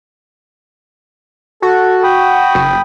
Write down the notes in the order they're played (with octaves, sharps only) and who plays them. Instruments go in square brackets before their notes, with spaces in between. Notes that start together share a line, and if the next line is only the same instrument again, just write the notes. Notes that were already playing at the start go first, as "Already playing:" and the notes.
[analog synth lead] F#4 [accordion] A4
[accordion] G5 B5 D#6
[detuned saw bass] F#1